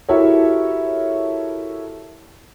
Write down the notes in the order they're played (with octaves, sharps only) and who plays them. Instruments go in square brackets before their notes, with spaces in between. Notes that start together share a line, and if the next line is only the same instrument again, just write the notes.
[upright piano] E4 F#4 G4 A4 A#4 C#5